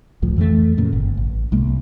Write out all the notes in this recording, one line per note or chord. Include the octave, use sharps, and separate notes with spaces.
G#1 C#2 A2 F3
F2 E3 G3 A3
F2 A#2 C#3
G1
A1
C2 G#3 A#3